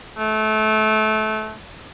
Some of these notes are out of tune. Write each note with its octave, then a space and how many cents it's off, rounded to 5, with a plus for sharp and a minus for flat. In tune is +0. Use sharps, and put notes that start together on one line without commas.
A3 -25